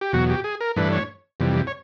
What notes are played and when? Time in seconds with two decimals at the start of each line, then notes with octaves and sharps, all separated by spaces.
0.01 G4
0.13 E2 B2 F#3 F#4
0.29 G4
0.44 G#4
0.61 A#4
0.76 G2 E3 A3 D4 B4
0.92 C#5
1.40 F2 C3 E3 G3
1.67 C#5